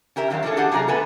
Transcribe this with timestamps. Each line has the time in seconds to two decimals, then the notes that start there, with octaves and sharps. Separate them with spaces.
0.16 C#4 G4 A#4 E5
0.30 D#3 F3 F#3 F5
0.43 C#4 D4 F4 F#4 G#4 A4
0.57 D4 G4 G#4 F#5 A5
0.72 C3 F#3 F4 G#4 C#5 A#5
0.88 D3 A3 B3 A4 B4 G#5